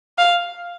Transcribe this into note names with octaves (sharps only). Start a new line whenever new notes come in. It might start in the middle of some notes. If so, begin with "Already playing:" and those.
F5